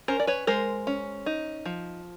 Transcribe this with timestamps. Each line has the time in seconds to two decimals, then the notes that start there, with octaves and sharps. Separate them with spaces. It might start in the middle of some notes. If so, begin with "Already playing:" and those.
0.08 C#4 A#4 C5
0.20 D5
0.27 B4 C#5
0.47 G#3 A#4 C5
0.87 C#4
1.26 D#4
1.65 F3